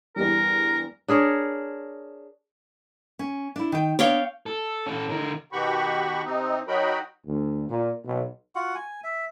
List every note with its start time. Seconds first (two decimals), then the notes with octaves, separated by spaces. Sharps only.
0.16 E2 G2 G3 A#4
1.08 D4 G#4 A#4 C#5
3.19 C#4
3.56 D4 E4
3.72 D#3 G5
3.99 B3 D4 C#5 D5 F5 G5
4.46 A4
4.86 C#4 A4
5.09 D3 A#4
5.52 B2 D#3 F#4 G4 B5 C#6
6.25 C3 C4 D#4
6.68 F#3 D#4 F#4 A#4 G5 B5
7.27 D2
7.69 A#2
8.05 B1
8.55 F4 F#4 F#5
8.75 G#5
9.04 E5